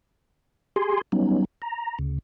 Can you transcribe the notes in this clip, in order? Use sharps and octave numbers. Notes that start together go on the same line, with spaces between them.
G4 G#4 G#5 C6
F#3 G3 B3 C#4 D#4
A#5
D2 C#3